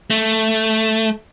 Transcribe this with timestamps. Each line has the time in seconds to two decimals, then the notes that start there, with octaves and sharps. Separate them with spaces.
0.10 A3